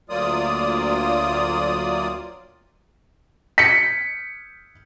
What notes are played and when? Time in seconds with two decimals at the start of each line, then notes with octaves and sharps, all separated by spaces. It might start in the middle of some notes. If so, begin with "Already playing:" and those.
0.09 D2 F#3 A#3 F4 D5 D#6
3.58 B6 C#7